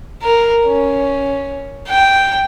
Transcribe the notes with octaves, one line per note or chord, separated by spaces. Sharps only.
A#4
C#4
G5